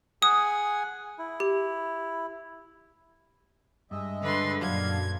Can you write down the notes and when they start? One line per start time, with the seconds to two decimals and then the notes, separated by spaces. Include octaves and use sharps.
0.22 G#4 F#5 G#5 D#6
1.19 E4
1.40 G4
3.91 G2 G#3 D#5 E5
4.23 D3 B4 C6
4.62 F#2 A#2 F#3 D4 F5 G#6